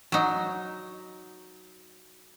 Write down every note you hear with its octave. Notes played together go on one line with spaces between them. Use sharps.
F#3 D#4